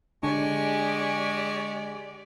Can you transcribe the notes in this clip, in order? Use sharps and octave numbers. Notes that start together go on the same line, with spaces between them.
D3 G#3 D4 G4 D5 G#5 C#6